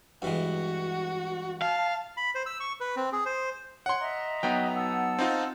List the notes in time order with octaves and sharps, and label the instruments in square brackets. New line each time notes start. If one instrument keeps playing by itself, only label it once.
[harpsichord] G2 E3 G#3 [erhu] F#4
[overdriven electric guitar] F5 [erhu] A5
[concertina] B5
C5
E6
C#6
B4
C4
G#4
C5
[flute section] C#5 [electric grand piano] F#5 C6
[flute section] D#5 E5 A#5
[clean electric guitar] F#3 B3 D#4 [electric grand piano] G5
[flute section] F#5 A5 E6
[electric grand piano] C4 D#4 F4